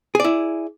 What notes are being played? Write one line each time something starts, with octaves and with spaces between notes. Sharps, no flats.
E4 G#4 D5